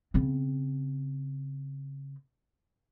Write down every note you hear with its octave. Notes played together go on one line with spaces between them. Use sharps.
C#3 C4